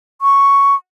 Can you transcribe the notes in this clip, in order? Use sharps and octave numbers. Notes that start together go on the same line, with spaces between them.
C#6